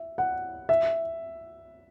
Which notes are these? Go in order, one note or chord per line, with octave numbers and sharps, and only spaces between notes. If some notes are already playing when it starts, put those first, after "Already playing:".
Already playing: E5
F#5
E5